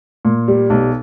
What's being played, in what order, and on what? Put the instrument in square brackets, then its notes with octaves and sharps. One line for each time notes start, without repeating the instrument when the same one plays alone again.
[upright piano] A#2
G3
B1